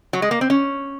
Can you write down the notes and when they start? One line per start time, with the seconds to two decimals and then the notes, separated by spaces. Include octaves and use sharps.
0.13 F#3
0.22 G#3
0.31 A#3
0.41 C4
0.50 C#4